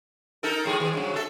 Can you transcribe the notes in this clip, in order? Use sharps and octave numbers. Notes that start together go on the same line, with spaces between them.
D#4 A4 A#4
A2 F3 G#4
D#2 G#4
G2 C#3 F#3
G#3 A4 E5